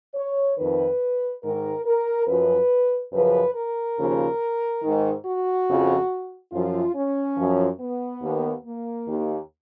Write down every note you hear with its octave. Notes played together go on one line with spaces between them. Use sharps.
C#5
F2 D#3 B4
G#2 D#3 A#4
A#4
F#2 F3 B4
F#2 C#3 F3 B4
A#4
D#2 C#3 F3
G#2 D#3
F#4
F2 C#3 F3
F#2 F3 F4
C#4
F#2 F3
B3
D#2 D#3
A#3
D#2 D#3